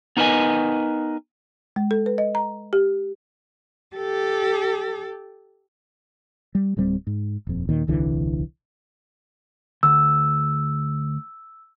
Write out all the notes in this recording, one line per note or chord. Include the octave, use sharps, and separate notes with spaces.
B3 D#4 A#4 B4 D#5 G#5
G#3
A4
B4
D#5
A#5
G4
G4 A4
G3
D1 G2 G3 C4
G#2
D#1 F2
D#2 A#2 D#3
D#1 C2 D3 E3
D2 E6